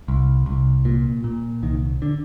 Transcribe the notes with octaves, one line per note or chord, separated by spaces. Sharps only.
C2
C2
A#2
A#2
C2 D#3
D3